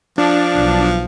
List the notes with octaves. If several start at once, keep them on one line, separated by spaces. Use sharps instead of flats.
F3 D4
B1